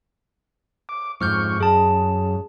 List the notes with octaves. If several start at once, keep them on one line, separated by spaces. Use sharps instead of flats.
D6
F2 G#2 C#6 D6 F6 G6
F#2 G#4 A5